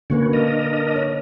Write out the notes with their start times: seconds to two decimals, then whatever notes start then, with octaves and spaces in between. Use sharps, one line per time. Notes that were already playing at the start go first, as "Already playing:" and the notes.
0.10 D3 A#3 C#4 F#4 B4
0.33 D4 A#4 D#5
0.96 C#5